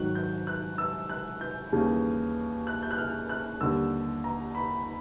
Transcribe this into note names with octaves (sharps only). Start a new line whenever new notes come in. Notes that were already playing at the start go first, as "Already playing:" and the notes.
Already playing: G#2 D#3 F#3 F#6
G6
F#6
E6
F#6
G6
D#2 C#3 E3 G3
F#6
G6
F#6
F6
F#6
D#2 D3 G3 E6
A#5
B5